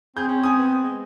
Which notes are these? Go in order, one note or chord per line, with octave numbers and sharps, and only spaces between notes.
C4 G#4 G6
C#4
G#5 D#6
B3
G#3